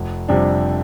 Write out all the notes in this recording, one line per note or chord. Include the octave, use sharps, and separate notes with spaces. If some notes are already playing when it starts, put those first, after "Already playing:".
Already playing: F1
F2 C3 G3 D4